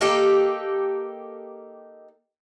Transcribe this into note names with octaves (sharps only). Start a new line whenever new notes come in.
A#3 D#4 G4 A4